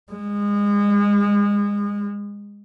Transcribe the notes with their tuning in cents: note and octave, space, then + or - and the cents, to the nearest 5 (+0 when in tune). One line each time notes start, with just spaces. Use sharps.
G#3 -30